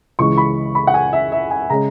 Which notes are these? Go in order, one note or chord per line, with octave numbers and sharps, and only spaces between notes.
C#2 C#3 E3 G#3 C#6
B5
B5
F#5
G#5
E5
E5
G#5
C#3 G#3 C#4 A#5